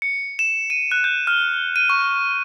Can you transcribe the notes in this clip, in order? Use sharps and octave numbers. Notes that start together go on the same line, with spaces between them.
C#7
E7
D#7
F#6
G6
F6
D#7
C#6